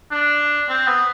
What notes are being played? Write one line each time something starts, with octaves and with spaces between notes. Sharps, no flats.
D4
C4
B3